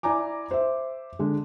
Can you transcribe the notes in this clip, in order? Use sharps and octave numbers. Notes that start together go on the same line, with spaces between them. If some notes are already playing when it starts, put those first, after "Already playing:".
E4 D5 G#5 A#5 D6
C5 E5
D3 G#3